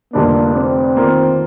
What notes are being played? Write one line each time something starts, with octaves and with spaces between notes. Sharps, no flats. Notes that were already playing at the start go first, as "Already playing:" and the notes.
F1 F2 D3 G3 A#3 D4
C4
D#3 A#3 F4